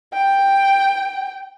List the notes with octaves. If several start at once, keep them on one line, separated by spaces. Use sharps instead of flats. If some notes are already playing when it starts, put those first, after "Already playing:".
G5